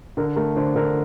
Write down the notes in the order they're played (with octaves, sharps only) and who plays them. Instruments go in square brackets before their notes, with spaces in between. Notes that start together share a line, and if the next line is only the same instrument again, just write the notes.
[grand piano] D3 [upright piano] A#4
[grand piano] A3 [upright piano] A#4
[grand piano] D3 [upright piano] C5
[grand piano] D3 [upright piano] A#4